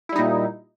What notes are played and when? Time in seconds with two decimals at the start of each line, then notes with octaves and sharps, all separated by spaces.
0.09 E4
0.12 G3
0.16 D#4
0.19 A#2